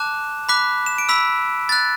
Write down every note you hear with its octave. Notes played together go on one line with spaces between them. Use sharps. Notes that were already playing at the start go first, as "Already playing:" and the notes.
Already playing: A5 D6 F#6 E7
B5 D6 F#6 B6
E7
D7
B5 E6 B6
B5 F#6 A6